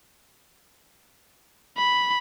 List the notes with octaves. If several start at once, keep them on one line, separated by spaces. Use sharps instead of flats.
B5